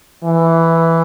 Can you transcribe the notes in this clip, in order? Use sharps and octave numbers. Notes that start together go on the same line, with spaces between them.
E3